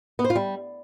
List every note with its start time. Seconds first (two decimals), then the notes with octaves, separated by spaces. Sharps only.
0.19 B3
0.24 C5
0.30 F4
0.36 G3